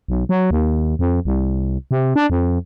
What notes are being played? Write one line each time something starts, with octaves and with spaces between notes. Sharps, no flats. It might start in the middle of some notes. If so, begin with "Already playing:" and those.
B1
F#3
D#2
F2
C2
C3
D4
F2